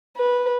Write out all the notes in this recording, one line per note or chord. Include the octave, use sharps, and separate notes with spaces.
B4